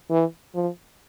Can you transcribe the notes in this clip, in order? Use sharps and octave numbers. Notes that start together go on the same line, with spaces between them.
E3
F3